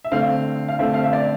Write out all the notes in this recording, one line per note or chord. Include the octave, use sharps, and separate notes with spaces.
E5
D3 A3 C4 F5
F5
D3 A3 C4 E5
F5
E5
D5